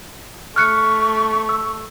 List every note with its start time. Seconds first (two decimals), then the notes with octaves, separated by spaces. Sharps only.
0.56 A3 C#6 F6 F#6 C#7
1.49 E6